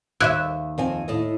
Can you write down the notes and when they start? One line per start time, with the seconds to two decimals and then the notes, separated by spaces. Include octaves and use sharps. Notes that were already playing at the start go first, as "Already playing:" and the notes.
0.21 D#2 E4 E5 E6 F#6 G#6
0.78 F2 C4 G#5
1.08 A2 A4 D#5